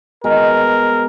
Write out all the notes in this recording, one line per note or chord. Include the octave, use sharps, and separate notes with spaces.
B2 G#3 A#4